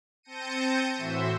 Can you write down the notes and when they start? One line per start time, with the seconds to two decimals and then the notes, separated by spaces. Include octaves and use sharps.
0.23 C4 A5 G6 A#6 C#7 D#7
0.95 A2 E3 F#4 C5 E5